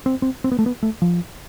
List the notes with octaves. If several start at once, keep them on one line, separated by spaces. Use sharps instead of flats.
C4
C4
C4
B3
A3
B3
A3
F3